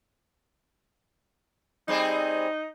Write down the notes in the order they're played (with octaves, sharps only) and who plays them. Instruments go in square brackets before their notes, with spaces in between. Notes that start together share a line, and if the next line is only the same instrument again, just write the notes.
[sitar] G3 C4 G#4 [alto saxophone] D#4